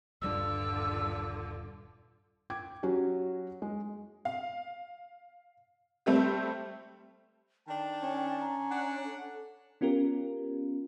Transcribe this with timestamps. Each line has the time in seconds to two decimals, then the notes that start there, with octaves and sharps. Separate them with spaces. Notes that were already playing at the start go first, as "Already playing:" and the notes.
0.22 D#1 G2 D3 G3 D4 F4 E6
2.50 G5 D6 G#6
2.83 F#3 C#4 F#4 G4
3.62 G#3
4.25 F5
6.06 G3 A3 C4 G4
7.68 D#3 D4 G5 A5
8.02 C#4
8.40 A#5
8.71 D4 D5 F#5
9.05 A4
9.81 B3 C#4 F4 G4 A#4